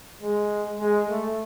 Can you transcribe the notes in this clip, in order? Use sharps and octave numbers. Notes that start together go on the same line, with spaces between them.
G#3
G#3
A3